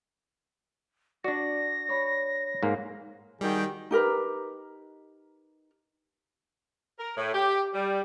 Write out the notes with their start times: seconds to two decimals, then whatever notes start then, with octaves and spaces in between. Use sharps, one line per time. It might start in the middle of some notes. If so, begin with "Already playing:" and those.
1.24 D4 F#4 D5 A#6
1.89 C#5 B5
2.63 G#2 A#3
3.41 D#3 G3 F#4 G#4 G5
3.91 D#4 G4 A#4 B4
6.99 A#4
7.17 A2
7.33 G4
7.74 G3